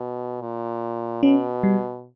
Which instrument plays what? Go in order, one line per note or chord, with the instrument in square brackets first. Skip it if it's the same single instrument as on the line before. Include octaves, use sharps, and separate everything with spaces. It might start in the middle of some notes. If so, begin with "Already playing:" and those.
Already playing: [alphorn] B2
A#2
[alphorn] B2 [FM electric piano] C#4
[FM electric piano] G3